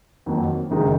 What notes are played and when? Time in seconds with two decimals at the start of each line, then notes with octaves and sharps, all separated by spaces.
0.26 F2 D#3 F#3 A#3
0.71 F#1 F#2 D#3 G#3 D#4